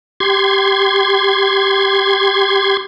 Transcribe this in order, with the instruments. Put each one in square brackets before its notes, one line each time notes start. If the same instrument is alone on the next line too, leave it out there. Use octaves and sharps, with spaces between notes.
[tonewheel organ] G4 C6 G#6